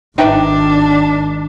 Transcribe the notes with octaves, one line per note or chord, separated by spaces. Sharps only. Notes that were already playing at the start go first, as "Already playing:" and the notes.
G#1 D#3 D4 D#4 B4 E5 G5